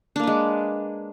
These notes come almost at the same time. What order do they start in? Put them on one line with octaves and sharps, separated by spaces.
D4 A#3 B4 G#3